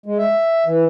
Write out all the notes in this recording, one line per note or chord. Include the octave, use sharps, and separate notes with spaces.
G#3
E5
E3